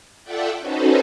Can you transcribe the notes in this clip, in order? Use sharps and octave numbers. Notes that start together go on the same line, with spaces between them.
F4 A4 D5 E5 F#5 G5
C#4 D#4 F#4 A4 B4 C5